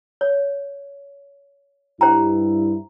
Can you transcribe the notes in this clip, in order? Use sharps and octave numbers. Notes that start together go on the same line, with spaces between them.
C#5
G2 E4 C5 G5 A#5